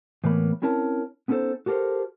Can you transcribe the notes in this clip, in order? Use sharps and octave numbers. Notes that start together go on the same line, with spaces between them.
A2 E3 A#3 B3 C#5 B5
C4 C#4 E4 A#4 C#5 A5
B3 C#4 D#4 G#4 A4 C5
F#4 G4 A4 A#4 C5